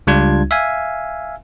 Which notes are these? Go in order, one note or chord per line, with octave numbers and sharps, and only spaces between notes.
C#2 G3 D4 F4 G#6
E5 F5 G#5